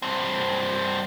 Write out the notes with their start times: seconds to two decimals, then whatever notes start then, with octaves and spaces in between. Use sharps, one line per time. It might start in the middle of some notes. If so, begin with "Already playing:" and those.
0.02 G2 C4